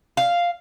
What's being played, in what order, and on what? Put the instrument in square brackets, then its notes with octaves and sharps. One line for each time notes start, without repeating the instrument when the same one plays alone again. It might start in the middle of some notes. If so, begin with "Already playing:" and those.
[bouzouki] F5